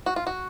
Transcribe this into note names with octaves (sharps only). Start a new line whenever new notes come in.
F#4
F4
F#4